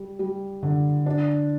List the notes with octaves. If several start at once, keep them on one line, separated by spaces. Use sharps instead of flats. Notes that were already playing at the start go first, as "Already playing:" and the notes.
Already playing: G3
G3
D3
D4